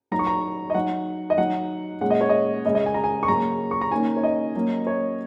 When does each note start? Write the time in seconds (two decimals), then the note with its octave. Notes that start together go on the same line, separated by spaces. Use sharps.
0.11 F#3 D#4 A#5
0.19 C#6
0.27 A#5
0.70 D#5
0.75 F#3 D#4 F#5
1.30 D#5
1.38 F#3 D#4 F#5
2.01 A#2 G#3 C#4 F#5
2.10 D#5
2.21 C#5
2.29 D#5
2.65 C#3 G#3 C#4 D#5
2.75 D#5
2.86 G#5
2.94 A#5
3.04 G#5
3.23 C#6
3.28 C#3 F#3 A#3 C#4 A#5
3.71 C#6
3.81 A#5
3.91 D#3 A#3 C#4 G#5
4.16 C#5
4.23 D#5
4.55 F#3 A#3 C#4
4.87 C#5